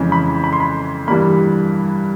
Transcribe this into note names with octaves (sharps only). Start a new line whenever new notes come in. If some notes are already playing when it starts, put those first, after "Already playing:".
Already playing: F2 C#3 E3 G#3
B5
B5
C6
B5
G2 E3 G3 A#3 B5